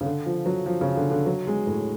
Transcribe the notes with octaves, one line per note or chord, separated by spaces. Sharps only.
C#3
D3
F3
F#3
F3
C#3
D3
D3
F#3
G#3
A2